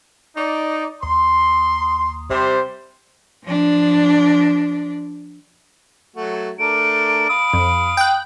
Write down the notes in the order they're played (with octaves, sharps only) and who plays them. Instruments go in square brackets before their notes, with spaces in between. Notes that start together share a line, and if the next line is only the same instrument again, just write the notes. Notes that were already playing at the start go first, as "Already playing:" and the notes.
[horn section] D#4 D5
[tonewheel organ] D#2 [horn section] C6
[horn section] C3 G3 C5
[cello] F3 D4
[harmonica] F#3 A3 F#4
[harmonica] A3 D4 A#4 [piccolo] D7
[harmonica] F5 B5 D#6
[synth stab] F2
G5 F#6